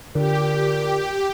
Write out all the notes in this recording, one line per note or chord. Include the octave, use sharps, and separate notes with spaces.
A#2 D3 G4